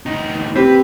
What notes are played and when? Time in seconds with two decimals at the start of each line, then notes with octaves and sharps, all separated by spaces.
0.06 D2 D#4
0.56 C4 G4 B4